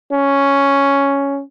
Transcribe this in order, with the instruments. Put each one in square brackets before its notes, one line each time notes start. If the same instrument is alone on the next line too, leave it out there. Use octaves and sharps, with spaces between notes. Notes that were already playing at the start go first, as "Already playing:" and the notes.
[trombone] C#4